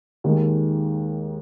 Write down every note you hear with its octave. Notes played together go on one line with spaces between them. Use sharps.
D#2 D#3 G#3